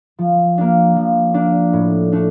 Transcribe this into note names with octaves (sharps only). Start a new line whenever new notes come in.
F3
A#3 D4
F3
A#3 D4
A2
A3 D4